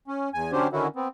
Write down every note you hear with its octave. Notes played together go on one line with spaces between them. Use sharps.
C#4
E2 G#5
D3 F#3 C#4 D4 G4 C5
D3 D#3 C#4 E4 F#4
B3 C4